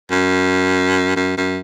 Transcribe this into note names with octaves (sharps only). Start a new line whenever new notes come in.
F#2
F#2
F#2